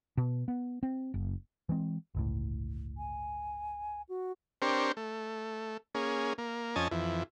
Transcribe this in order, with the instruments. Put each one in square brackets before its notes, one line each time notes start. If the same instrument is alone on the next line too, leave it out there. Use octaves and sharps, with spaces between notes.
[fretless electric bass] B2
B3
C4
F#1
[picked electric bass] E3 G#3 C4
G1 C#2 A2
[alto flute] G#5
F#4
[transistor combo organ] C4 D4 G4 A#4 C5 C#5
A3
A#3 C#4 G#4
A#3
F2 C#4 D#5 G#5 A5
F2 E3